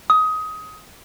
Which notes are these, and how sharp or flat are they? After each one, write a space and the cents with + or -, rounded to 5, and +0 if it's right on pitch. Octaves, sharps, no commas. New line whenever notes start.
D#6 +20